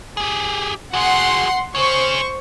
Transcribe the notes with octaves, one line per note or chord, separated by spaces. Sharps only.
G4 G#4
F#4 G#4 F#5 C6
G#4 C5 C#5 C#6